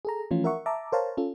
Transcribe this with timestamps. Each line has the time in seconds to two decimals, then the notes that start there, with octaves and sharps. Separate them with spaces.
0.05 G#4 A4 A#5
0.31 E3 F3 A3 C#4 F4
0.44 A#4 E5 F#5 C#6
0.66 E5 A5 A#5 D6
0.92 A#4 C5 C#5 F5 A5 A#5
1.17 C#4 F4 A4